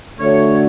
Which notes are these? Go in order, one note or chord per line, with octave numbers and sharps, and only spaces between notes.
D3 A3 D4 F#4 C#5